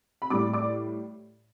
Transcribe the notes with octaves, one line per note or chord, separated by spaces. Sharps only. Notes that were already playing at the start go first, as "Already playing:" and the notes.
B5
A2 G3 D5 D6
D5 D6